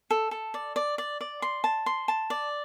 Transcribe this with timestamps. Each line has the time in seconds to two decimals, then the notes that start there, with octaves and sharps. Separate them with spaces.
0.11 A4
0.31 A4
0.54 D5
0.76 D5
0.98 D5
1.21 D5
1.42 C6
1.64 A5
1.86 C6
2.08 A5
2.30 D5